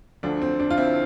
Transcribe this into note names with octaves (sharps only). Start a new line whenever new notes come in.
D2 D3 F3 D4
C4
D4
F4
C4 E4